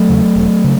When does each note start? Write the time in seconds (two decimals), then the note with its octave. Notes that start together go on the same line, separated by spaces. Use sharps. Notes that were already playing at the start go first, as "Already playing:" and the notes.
Already playing: F#3 A3
0.09 E2 C#3
0.36 E1
0.64 C#3